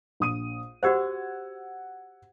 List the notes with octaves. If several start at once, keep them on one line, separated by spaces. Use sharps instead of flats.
A#1 D#6 D#7
F#4 G4 C5 F#5 E6 G#6